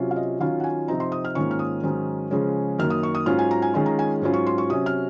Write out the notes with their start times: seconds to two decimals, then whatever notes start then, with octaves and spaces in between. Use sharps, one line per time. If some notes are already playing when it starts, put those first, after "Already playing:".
Already playing: C3 F#3 C#4 F4
0.11 F5
0.16 D#5
0.40 D#3 F#3 C#4 F4 F5
0.60 F#5
0.64 G#5
0.88 C3 F3 C4 D#4 A#5
1.00 C6
1.12 D#6
1.25 F6
1.35 G#2 D#3 A#3 C#4 F4 C#6
1.51 F6
1.59 D#6
1.83 G#2 D#3 F#3 C#4
2.31 C#3 F3 G#3 C#4
2.78 F#2 D#3 A#3 F6
2.90 D#6
3.03 C#6
3.15 D#6
3.26 G#2 F#3 C#4 F4 F6
3.39 G#5
3.51 A#5
3.62 G#5
3.74 D#3 G#3 C#4 F4
3.86 A#5
3.99 G#5
4.22 G#2 F#3 C#4 F4
4.34 C#6
4.47 C6
4.58 C#6
4.70 C3 F#3 C#4 D#6
4.86 F6